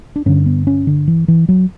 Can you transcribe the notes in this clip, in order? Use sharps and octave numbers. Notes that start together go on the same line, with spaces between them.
D4
G2 D3 C#4
B3
C#4
D3
E3
E3
F#3